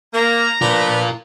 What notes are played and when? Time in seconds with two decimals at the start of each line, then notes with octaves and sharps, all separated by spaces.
0.14 A#3 A#5
0.61 F3 D4 F4 A#4 B4